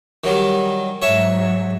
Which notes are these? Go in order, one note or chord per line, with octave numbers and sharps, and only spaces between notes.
D#3 F#3 G3
G#2 F#3 C#5 E5 A5